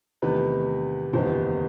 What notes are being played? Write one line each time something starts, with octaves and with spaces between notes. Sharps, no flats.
E2 C3 D#3 A3 B4
F#1 E2 D#3 G3 B3 C5